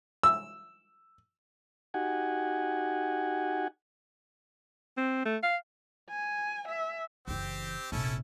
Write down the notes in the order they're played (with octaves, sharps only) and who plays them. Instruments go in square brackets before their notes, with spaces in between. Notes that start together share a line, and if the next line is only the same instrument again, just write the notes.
[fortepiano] E6
[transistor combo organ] D#4 F#4 G4 F#5 G#5
[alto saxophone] C4
A3
F5
[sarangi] G#5
E5
[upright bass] F#1 E3 [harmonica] C4 G4
[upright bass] F1 A#1 [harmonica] C#4 E4 A4